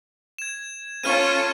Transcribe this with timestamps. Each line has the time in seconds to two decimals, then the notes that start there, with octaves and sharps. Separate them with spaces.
0.38 G#6 E7
1.03 C#4 F4 A4 C#6 F6 D#7